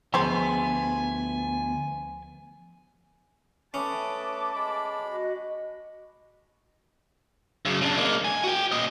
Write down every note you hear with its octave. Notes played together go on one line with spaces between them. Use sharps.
D2 F3 G#3 B3 C5 G#5 B5
A3 C#4 B4 A5 D6 D#6
G#3 B5
F#4 D#5
F#2 C#3
C#3 D4
G#3 A#3
G#5
F#4 G5
A#2 D#5